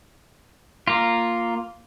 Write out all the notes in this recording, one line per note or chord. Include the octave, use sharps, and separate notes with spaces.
A#3 F4